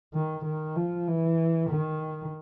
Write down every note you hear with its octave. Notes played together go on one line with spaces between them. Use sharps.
D#3
D#3
F3
E3
D#3